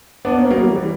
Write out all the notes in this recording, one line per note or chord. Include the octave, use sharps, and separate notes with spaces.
B3 D4
A#3 C#4
B3
F#3 A#3
E3 G3
E3 G3